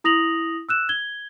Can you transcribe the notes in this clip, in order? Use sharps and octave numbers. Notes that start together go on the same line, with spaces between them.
E4 D#6 A#6 F7 F#7
E6 F#6 E7
G#6 G7